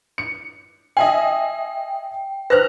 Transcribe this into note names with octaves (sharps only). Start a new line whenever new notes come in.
C#7
D#5 E5 G5 G#5
B4 C5 F6 F#6 A#6